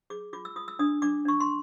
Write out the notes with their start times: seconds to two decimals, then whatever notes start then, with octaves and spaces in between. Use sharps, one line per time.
0.10 G#4 D6
0.33 F4 D6
0.45 E6
0.56 F4 D#6
0.68 E6
0.79 D4 D#6
1.02 D4 D6
1.25 D4 C#6
1.40 C6